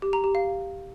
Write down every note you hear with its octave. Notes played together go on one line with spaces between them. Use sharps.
G4
A#5
G4
F5